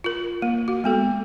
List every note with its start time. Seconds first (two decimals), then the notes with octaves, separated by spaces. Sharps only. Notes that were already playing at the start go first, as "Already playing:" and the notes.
0.04 F4 A#4
0.42 A#3
0.68 F#4
0.84 G#3 B3 A4